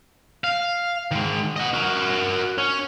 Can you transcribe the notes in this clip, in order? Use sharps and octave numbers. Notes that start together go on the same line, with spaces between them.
F5
D#3 G#3
D#5 F#5
F#4 A#4
C#4